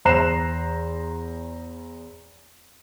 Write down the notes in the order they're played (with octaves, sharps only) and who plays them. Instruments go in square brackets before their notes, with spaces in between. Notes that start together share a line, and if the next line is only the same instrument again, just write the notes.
[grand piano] E2 C5 A#5 F#6 C7 E7